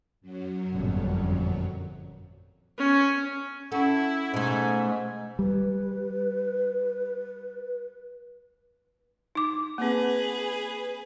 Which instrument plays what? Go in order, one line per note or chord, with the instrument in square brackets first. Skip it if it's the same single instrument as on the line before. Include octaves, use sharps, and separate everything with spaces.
[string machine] F#2 F#3
[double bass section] G1 F2 A#2
[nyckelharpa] C#4
[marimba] C#4 F#5 [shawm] E4 [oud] A4
[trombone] G#2 [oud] B2 A3 [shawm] G#5
[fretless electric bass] G3 [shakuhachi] B4
[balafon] D#4 D6
[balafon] A#3 C4 [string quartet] G#4 B4